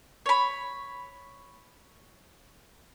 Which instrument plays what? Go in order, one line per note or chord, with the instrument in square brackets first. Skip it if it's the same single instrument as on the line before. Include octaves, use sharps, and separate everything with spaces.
[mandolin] C#5 B5